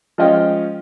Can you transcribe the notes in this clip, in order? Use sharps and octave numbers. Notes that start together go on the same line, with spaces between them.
F3 G#3 C#4 D#5 F5 G5